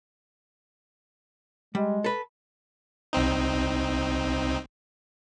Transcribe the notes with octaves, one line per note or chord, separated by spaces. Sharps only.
G3 G#3
A4 B4
C2 C4 D#4